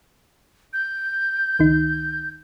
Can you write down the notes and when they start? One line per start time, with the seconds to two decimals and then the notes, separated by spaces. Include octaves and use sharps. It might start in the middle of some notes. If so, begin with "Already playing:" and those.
0.73 G6
1.59 C#2 D#3 D#4